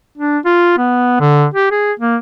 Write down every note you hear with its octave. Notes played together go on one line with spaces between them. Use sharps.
D4
F4
B3
D3
G4
G#4
A#3